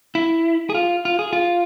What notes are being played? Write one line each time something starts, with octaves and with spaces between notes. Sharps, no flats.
E4
G#4
F4
F4
G#4
F4